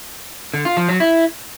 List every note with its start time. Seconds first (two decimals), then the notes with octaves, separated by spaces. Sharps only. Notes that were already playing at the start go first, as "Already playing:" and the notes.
0.54 D3
0.65 F4
0.77 F3
0.89 F#3
1.00 E4